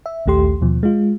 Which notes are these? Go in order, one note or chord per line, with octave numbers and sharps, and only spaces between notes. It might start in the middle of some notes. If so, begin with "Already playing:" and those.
E5
A#1 D#2 A3 G4 C6
D#2 B2 F3
G#3 F4